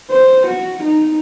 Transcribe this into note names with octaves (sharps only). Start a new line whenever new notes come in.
C5
F#4
D#4